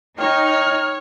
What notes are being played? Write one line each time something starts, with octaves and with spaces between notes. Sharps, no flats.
D#4 C#5 G5 F6